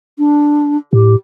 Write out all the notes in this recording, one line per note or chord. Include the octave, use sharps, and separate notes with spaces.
D4
A2 G4